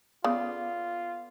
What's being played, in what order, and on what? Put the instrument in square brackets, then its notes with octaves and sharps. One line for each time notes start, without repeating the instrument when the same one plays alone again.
[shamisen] C#3 [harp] B3 A4 D5 [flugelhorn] F4